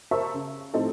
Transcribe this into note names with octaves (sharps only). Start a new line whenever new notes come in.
A#4 C5 E5 A5 C#6
C#3
A2 F3 C4 D#4 E4 A4